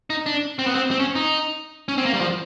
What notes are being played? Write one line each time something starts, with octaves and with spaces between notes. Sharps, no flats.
D#4
D4
C4
B3
C4
C4
C#4
D#4
C#4
C4
A#3
G3
F3